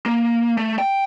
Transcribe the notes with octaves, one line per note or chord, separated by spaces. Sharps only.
A#3
A3
G5